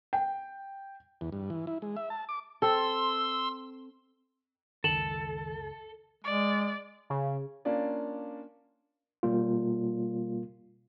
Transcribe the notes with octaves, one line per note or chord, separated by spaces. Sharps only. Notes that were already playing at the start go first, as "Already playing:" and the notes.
G5
E2
G2
E3
E4
G#3
E5
A5
D6
C4 A4 C6 E6
F#1 C#2 D#3 A4 E7 F#7
G#3 D5
C#3
A#3 C#4 D4 F4 D5
B2 G3 A#3 F4